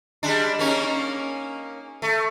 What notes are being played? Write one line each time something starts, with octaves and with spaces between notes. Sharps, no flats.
G3 G#3 D4
A#3 C#4 D#4
A3